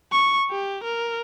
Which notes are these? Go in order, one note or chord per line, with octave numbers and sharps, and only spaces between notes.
C#6
G4
A#4